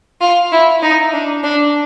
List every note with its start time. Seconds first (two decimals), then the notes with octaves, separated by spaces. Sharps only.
0.21 F4
0.52 E4
0.82 D#4
1.13 D4
1.43 D4